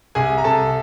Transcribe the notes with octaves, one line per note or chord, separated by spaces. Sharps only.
C2 G#4 G#5
A#5
C2 A4 A5